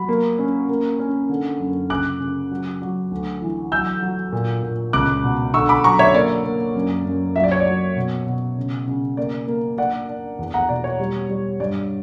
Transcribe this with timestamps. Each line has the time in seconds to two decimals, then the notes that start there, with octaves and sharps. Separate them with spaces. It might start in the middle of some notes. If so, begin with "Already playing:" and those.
Already playing: F#3 B5
0.09 A#3
0.38 C#4
0.69 A#3
0.99 C#4
1.29 D3
1.59 F#2
1.90 C#3 D6 F#6
2.20 C#3
2.51 F#3
2.82 F#3
3.11 D2
3.42 E3
3.72 F#3 E6 G6
4.02 F#3
4.32 A#2
4.63 A#2
4.93 C#2 D6 F#6
5.24 B2
5.54 D3 C#6 E6
5.69 B5 D6
5.84 F#3 A#5 C#6
5.99 C#5 E5
6.14 A#3 D5
6.44 A#3
6.75 F#2
7.06 F#2
7.36 F#3 E5
7.44 D5
7.51 C#5
7.59 D5
7.66 F#3
7.96 B2
8.26 B2
8.57 C#3
8.87 C#3
9.17 A#3 D5
9.48 A#3
9.78 D4 D5 F#5
10.09 D4
10.39 E2
10.54 F#5 A#5
10.69 B2 D5
10.84 C#5
11.00 G3
11.29 G3
11.60 G2 D5